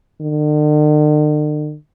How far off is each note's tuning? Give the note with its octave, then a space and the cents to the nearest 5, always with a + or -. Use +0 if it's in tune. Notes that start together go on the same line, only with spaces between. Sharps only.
D3 +45